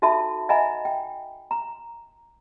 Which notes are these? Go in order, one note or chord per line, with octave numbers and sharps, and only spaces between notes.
D#4 F#4 A4 E5 A5 B5
D#5 E5 F#5 G#5 A#5 B5
G5
A#5